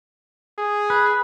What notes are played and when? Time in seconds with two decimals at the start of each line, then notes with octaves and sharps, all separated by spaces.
0.59 G#4
0.90 B4